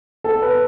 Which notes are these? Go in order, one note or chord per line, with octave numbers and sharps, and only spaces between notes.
A4
B4